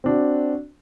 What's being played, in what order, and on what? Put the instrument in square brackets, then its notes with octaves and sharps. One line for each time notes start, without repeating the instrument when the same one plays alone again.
[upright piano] C4 D4 F#4